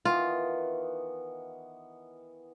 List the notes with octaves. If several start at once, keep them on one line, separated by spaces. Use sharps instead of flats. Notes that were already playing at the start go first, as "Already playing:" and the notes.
D#3 E3 B3 F4